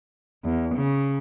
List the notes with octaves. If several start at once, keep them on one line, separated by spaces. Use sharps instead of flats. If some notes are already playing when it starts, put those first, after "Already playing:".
E2
C#3